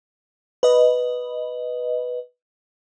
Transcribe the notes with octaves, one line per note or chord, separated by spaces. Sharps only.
B4 D#5